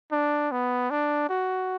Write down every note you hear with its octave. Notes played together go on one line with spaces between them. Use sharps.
D4
B3
D4
F#4